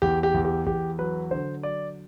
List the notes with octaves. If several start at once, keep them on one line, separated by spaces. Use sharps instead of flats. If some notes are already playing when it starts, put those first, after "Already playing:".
E2 G4
G4
E2
G4
E2 G4
F#3 B4
D3 C5
F#3 D5